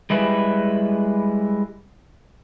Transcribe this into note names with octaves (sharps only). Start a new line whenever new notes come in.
G3 G#3 E4 B4